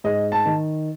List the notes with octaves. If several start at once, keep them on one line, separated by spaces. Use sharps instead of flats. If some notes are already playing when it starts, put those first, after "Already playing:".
G#2 D#5
A5
D#3